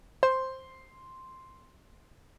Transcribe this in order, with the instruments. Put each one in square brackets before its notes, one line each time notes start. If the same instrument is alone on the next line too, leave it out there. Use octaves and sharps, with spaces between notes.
[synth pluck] C5 [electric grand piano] C6